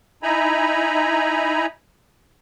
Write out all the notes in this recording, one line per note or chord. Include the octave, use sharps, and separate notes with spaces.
D#4 E4 G#5 A#5 B5